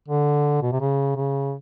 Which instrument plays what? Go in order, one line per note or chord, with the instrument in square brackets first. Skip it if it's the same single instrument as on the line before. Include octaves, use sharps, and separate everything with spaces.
[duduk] D3
B2
C3
C#3
C#3